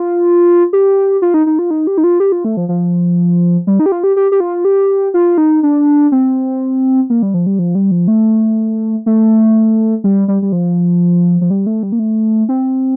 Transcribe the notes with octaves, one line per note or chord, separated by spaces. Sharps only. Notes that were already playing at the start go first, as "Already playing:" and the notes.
Already playing: F4
G4
F4
D#4
D#4
F4
D#4
G4
D#4
F4
G4
F4
A3
F3
F3
G3
D#4
G4
F4
G4
G4
G4
F4
G4
F4
D#4
D4
C4
A#3
G3
F3
G3
F3
G3
F3
A3
A3
G3
G3
G3
F3
F3
G3
A3
G3
A#3
A3
C4